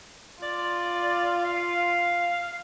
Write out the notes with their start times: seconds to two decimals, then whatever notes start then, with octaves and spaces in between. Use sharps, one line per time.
0.43 F4 D5
1.45 F5